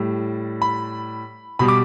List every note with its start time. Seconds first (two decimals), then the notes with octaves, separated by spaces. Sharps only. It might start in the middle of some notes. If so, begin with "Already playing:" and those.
Already playing: A2 G3
0.62 B5
1.59 B2 G3 B5
1.68 D6